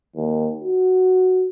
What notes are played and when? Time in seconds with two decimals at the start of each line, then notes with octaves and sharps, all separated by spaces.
0.16 D#2
0.64 F#4